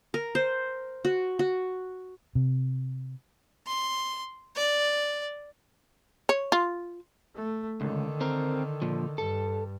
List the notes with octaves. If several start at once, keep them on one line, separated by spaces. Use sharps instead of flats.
A#4
C5
F#4
F#4
C3
C6
D5
C#5
F4
A3
C#2 D3 D#3
C4 A#4
A#2 F3
G2 A4